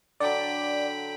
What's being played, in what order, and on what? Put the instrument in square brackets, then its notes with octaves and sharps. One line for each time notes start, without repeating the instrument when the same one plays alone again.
[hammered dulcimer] D3 F#3 [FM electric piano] D5 D6 [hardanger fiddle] G5 B5